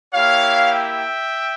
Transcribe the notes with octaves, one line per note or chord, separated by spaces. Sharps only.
A#3 E4 G4 C#5 F5
E5 G5